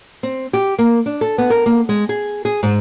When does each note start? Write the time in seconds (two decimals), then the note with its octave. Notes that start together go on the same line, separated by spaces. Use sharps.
0.23 C4
0.53 G4
0.79 A#3
1.06 D4
1.21 A4
1.38 B3
1.50 A#4
1.66 A#3
1.89 G#3
2.09 G#4
2.45 G#4
2.63 G#2